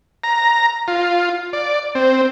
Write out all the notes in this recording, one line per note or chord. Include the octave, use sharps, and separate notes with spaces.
A#5
F4
D5
C4